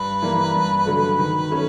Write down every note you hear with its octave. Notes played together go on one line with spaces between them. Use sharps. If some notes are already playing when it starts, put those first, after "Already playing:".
Already playing: G2 B4
E3 G3 A#3
G2
D3 F#3 A3
D#3
F#3 A3 C#4